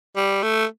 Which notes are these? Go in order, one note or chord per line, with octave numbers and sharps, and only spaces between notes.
G3
A3